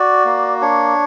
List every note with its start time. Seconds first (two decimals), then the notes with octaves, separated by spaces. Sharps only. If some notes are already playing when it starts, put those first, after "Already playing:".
Already playing: F#4 D5
0.25 A#3
0.62 D4 C#5